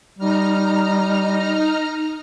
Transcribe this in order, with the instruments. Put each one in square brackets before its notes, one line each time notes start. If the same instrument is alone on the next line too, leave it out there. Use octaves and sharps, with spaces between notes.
[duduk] G3 [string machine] D#4 A#5 F6